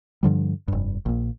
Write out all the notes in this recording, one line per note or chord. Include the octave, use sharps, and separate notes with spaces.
G2 D3 F3 G3
F1 G2
A#1 A#2